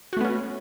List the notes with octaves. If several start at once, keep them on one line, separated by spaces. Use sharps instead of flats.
A3 B3 C#4 F#4